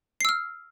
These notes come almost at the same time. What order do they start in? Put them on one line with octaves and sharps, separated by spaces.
C7 E6 F6